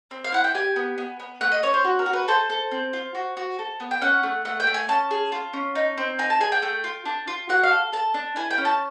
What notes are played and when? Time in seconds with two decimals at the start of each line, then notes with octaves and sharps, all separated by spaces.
0.11 C4
0.24 F5
0.32 E4 F#5
0.44 G5
0.54 G4 G#5
0.76 B3
0.98 B3
1.20 B3
1.41 A3 F#5
1.52 D#5
1.63 C#4 C#5
1.74 C5
1.85 F#4
1.99 A#4
2.06 F#4
2.13 B4
2.28 A4 C5
2.50 A4
2.71 C4
2.93 F4
3.15 F#4
3.37 F#4
3.59 A4
3.80 B3
3.91 G5
4.01 C#4 F#5
4.23 A3
4.45 A3 F#5
4.60 G5
4.67 A3
4.74 G#5
4.88 C#4 A5
5.11 G#4
5.32 F4
5.53 C#4
5.75 D#4
5.98 C4
6.19 D#4 G#5
6.30 A5
6.40 G#4 G#5
6.52 G5
6.62 A3 G5
6.84 F4
7.05 D4
7.27 F4
7.49 F#4 F#5
7.63 F5
7.71 A4
7.92 A4 A5
8.14 D4
8.36 E4 G#5
8.51 G5
8.58 C#4
8.65 A5